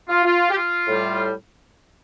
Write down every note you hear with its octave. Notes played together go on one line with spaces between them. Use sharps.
F4
F4
G4
F4
A2 G3